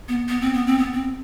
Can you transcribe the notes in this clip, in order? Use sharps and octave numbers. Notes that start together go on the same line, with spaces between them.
B3
B3
C4
B3
C4
B3
C4